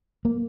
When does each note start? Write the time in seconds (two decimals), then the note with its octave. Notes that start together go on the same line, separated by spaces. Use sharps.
0.25 A#3